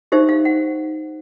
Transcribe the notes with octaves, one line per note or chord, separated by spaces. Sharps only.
D#4 G4 C5 E5
F5
F#5